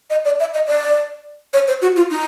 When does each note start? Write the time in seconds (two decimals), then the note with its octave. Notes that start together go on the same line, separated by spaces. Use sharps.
0.10 D#5
0.25 D5
0.40 E5
0.54 D#5
0.67 D5
1.53 C#5
1.68 C5
1.82 F#4
1.96 F4
2.11 D#4